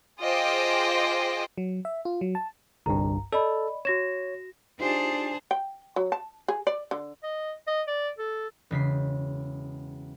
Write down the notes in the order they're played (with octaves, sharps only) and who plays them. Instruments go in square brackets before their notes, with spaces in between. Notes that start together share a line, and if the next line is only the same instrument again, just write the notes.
[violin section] F4 G#4 C5 D#5 G5 D6
[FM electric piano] F#3
E5
F4
F#3
A5
[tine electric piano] G1 C2 G2 [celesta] A#5
[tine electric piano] A4 [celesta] D5 D#5 B5
[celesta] F#4 A#6 E7 [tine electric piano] C#5
[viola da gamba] D4 [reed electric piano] D#4 F4 G4 [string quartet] G#4 A5 [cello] C5
[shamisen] G5
F#3
A5
G#4
D5
D3
[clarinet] D#5
D#5
D5
A4
[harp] E1 C#3 B6 C7